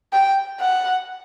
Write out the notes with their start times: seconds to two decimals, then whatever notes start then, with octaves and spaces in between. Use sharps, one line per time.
0.13 G5
0.60 F#5